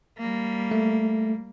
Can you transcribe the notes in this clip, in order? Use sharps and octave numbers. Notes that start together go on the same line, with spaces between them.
G3 A#3
A3